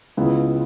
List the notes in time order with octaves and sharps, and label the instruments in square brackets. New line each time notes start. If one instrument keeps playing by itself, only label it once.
[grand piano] C#2 C#3 G#3 B3 E4